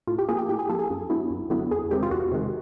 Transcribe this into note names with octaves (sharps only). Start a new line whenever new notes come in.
A2 F4
G4
F3 A#3 G#4
G4
A2 G4
G#4
F3 A#3 A4
G#4
F#2
D3 F#3 B3 E4
F#2
D3 F#3 B3 E4
E2 G#4
C3 D#3 G#3 G4
F4
E2 F#4
C3 D#3 G#3